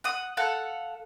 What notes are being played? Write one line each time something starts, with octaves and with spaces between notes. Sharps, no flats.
F#5 D#6
A4 F5 F#5